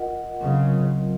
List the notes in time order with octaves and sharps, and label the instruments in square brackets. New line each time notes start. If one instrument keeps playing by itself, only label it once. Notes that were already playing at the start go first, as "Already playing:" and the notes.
Already playing: [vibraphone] F4 A#4 D#5 F#5
[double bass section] C#3 [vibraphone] F#3 C4 F4 A#4 D#5